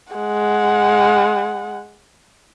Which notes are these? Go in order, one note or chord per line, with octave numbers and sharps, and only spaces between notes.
G#3 F#5